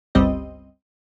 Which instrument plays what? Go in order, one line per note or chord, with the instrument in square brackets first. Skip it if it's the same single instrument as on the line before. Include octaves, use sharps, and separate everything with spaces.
[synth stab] G1 C#2 G2 G3 C4 D#5